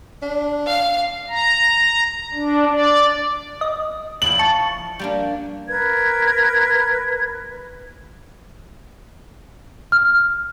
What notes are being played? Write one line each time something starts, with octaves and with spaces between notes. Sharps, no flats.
D4
F5
A#5
D4
D5
D#5
F3 E4 D5 F#7
A5 C#6
G3 A#3 D4
A#4 B4 G#6
F6